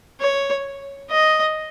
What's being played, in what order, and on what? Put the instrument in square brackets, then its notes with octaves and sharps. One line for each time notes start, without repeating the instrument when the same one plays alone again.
[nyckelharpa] C#5
D#5